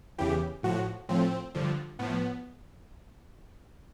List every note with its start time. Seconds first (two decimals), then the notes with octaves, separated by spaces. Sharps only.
0.18 E2 C#3 E3 G4
0.63 A2 F3 F#4
1.09 A2 F3 C4
1.55 G2 D3 F3
1.99 A2 F3 B3